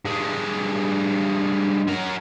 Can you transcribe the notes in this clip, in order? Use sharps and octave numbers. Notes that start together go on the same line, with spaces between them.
G2 G#3
F#3 A#4